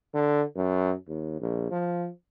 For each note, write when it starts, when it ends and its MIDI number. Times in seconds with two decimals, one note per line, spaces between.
0.14 0.43 50
0.56 0.94 42
1.08 1.37 39
1.40 1.66 34
1.71 2.08 53